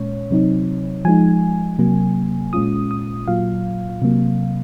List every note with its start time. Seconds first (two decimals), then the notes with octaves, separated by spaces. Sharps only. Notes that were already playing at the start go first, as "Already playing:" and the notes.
Already playing: A#2 G#3 C#4 C#5
0.31 C3 F#3 C4 D#4
1.05 F3 G#3 D#4 G#5
1.79 C3 F#3 A#3
2.53 A#2 G#3 C#4 F4 D#6
2.91 D#6
3.28 A#2 F#3 A#3 F4 F5
4.02 C3 F#3 A#3